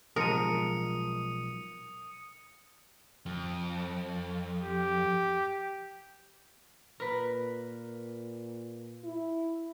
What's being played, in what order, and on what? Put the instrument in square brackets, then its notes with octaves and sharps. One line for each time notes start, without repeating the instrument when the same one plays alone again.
[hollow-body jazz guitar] B1 F3 G#3 [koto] A#4 [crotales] D#6 C#7 D#7
[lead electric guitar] F2
[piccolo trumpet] G4
[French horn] A#2 [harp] A#4 B4
[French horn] E4